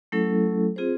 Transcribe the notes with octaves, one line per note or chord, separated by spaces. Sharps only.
F#3 A3 C#4 E4 A4
C4 F4 G#4 C5